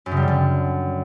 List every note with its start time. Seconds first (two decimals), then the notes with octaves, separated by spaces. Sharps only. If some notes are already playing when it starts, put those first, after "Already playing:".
0.06 F#2
0.11 C#3
0.17 G3
0.22 D3
0.28 F#2